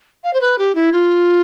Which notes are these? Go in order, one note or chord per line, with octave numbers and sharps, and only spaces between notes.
F5
C5
B4
G4
E4
F4